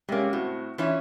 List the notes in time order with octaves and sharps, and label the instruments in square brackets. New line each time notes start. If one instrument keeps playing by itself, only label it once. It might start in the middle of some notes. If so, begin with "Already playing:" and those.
[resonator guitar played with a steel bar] C3 A#3 [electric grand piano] G3 G#3 C#4
[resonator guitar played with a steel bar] A2 [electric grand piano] C4 F#4
[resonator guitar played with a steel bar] E3 C#4 E4 [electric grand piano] D4 F4